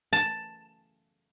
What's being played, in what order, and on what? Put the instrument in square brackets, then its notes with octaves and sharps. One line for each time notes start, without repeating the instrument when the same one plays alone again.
[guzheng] A5